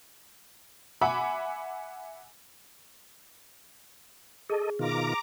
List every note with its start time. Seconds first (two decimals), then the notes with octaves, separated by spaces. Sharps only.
1.01 E5 F#5 G#5 B5 D6
4.50 G#4 A4 D#5
4.79 B2 D#3 F4 A#5 D6